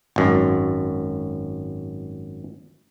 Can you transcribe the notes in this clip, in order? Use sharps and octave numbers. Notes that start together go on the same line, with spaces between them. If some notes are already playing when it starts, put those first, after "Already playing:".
G#1 F#2